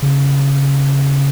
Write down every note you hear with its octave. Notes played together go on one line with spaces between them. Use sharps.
C#3